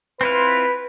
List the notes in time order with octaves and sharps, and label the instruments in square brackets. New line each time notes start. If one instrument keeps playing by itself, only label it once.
[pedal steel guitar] C4 E4 F4 [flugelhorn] B4